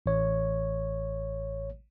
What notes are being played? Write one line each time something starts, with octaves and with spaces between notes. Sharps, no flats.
A1 C#5